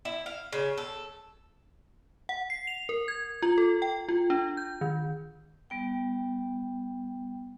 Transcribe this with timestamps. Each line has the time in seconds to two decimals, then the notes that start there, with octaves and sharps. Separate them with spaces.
0.05 E4
0.26 F5
0.53 C#3
0.78 A4
2.29 F#5
2.50 C7
2.67 F7
2.89 A#4
3.08 G#6
3.42 F4
3.58 A4
3.82 G5
4.09 F4
4.30 D4
4.57 G6
4.81 D#3
5.70 G3 B3 G5